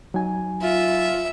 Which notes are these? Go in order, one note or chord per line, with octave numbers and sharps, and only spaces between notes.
F#3 D#4 G#5
F4 E5